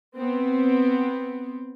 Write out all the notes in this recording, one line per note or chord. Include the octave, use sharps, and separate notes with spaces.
B3 C4